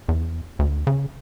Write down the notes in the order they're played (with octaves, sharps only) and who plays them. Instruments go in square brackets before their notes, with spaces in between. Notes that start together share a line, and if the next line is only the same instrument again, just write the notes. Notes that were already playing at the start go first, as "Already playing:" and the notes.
[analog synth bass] E2
D2
C#3